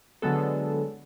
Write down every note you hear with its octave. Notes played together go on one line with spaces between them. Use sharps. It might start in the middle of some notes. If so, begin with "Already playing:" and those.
D3 F#3 G#3 B3 A4